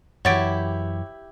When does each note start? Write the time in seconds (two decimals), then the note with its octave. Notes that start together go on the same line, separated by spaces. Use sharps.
0.25 F#2 E3 E4 G4 C#5 F#5 A6 D7